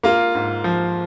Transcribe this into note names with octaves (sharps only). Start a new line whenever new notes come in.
A#3 F4
G#2
F3